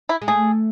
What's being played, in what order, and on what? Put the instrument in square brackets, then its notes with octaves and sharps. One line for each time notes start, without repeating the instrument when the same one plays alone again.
[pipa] E4
[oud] G#3
[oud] A3 [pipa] G#4